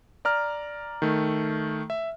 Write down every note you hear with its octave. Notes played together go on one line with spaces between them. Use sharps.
D5 A#5 F6
D#3 A3
E5